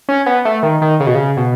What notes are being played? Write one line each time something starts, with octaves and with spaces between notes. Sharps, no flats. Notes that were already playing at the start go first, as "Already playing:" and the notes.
C#4
B3
A3
D#3
D#3
C#3
B2
C#3
B2